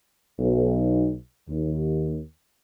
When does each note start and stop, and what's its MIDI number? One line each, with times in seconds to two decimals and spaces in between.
0.39 1.11 35
1.49 2.19 39